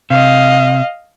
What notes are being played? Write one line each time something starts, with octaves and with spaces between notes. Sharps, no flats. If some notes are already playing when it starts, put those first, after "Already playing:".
C3 D#5 F5